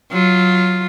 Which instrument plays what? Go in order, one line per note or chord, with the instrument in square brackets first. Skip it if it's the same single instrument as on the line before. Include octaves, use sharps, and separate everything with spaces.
[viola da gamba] F#3 F4